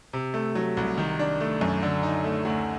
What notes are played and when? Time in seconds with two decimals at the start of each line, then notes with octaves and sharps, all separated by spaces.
0.13 C3
0.34 A3
0.55 F#3
0.77 C2
0.98 D#3
1.19 D4
1.40 A3
1.61 F#2
1.83 D3
2.03 D#4
2.24 A3
2.45 D2